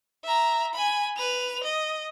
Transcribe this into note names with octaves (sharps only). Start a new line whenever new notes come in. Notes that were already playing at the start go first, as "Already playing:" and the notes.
E5 A#5
G#5 B5
B4 F7
D#5